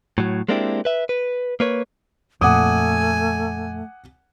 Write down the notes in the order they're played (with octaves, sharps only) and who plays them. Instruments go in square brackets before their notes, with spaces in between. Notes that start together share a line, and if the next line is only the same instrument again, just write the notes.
[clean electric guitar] A2 F#3
G#3 A#3 C4 D4 E4 G4
B4 E5
B4
A#3 B4 C#5
[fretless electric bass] F2 A#2 [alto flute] A3 [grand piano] F#5 D6 D#6 [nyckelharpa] G#5